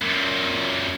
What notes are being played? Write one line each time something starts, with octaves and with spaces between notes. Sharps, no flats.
F#2 A#2